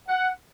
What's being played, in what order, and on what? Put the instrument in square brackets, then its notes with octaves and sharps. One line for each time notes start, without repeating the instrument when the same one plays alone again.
[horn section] F#5